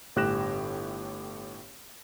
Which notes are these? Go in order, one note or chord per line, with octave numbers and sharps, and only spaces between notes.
G1 A2 G4 F#6 A#6 E7